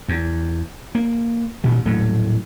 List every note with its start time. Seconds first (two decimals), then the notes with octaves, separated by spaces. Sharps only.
0.09 E2
0.95 A#3
1.64 A1 G2 A#2 D#3
1.86 D#1 A2 F#3 A3